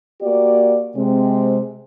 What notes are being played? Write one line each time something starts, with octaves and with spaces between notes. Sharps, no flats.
A#3 F#4 G4 D5
C3 G#3 C4